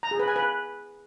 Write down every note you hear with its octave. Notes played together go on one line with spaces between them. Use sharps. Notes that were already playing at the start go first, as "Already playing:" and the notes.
A#5
G#4
B4
G#5
B4